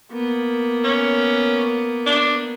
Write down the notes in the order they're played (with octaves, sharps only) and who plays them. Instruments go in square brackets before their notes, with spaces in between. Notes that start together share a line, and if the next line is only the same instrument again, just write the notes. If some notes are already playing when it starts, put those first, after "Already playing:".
[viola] A#3 B3
[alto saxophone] C#4
D4